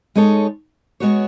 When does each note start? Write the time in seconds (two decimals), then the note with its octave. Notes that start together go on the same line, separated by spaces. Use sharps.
0.16 G#3 D#4 A4 C#5
1.00 G#3 B3 F#4 C#5